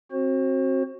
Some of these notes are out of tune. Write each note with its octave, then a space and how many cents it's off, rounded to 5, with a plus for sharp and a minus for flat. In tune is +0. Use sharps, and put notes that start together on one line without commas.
C4 +25 F#4 +0 C5 +35